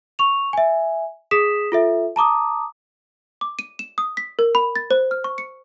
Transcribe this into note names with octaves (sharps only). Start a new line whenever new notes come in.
C#6 F7
E5 G#5
G#4 D#6 B6 E7
F4 A4 E5
A5 A#5 D6 D#6
D6
D#7
E7
D#6
B6
A#4
B5
A6
C5
F6
C#6
C#7